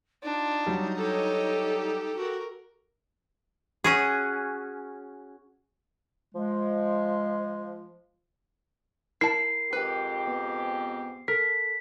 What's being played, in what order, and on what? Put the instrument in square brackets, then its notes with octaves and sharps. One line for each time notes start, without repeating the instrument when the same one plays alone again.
[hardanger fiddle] D4 F4 [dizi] D#4
[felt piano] F#3 G3
[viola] G4 A4 [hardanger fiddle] C#5 D#5
[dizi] F#4 [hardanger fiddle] A#4
[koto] C#4 F#4 G#4
[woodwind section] F3 G#3
[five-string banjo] E4 A5 [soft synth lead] A#4 [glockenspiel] C7
[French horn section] F2 G#2 G4 [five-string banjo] B4
[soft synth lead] B3
[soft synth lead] A4 [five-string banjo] A#4 [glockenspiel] B6